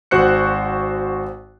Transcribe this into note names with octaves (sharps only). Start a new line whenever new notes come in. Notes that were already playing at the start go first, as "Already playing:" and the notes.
G#1 F#4 C5 F#6 C#7